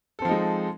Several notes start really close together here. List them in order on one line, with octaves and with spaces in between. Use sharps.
A4 C4 F3 D#4 G#3